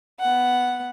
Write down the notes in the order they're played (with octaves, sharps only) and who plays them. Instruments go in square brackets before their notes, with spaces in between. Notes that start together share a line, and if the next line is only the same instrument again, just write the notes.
[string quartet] B3 F#5